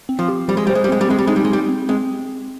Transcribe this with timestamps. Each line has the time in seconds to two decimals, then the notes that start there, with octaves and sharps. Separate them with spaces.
0.09 C4
0.19 F3
0.28 G4
0.48 F3 G3
0.57 G#3
0.67 G3 C5
0.75 G#3
0.84 G3
0.89 G#3 C4
1.01 G3
1.09 G#3 C4
1.19 G3
1.27 G#3 D#4
1.36 G3
1.45 G#3
1.49 G3 G4
1.69 C4
1.89 G#3 C4